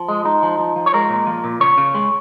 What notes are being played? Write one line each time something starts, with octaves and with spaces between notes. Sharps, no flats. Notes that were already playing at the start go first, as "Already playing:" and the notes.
Already playing: F3
G#3
G#3 D#4
F3
F3
F3
C#5
G#3 A#4
A#2
F3
A#2
C#3 C#5
C#3
G#3